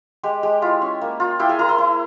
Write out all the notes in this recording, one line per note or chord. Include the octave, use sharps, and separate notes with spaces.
G#3 G4
G#3 G4
E4 F4 E5
C#4
A#3
F4
E4 G4 G5
G#4 G#5
E4 A#4 A#5
C5 C6
E4